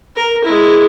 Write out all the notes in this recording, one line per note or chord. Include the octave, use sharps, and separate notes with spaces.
A#4
G#3 E4